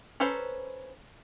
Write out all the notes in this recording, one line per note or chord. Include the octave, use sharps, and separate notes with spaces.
C#4 A4 B4 C5 A#5